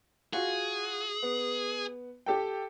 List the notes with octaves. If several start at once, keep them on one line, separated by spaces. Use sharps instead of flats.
F4 F#4 G#4
B3
G4 A4 G5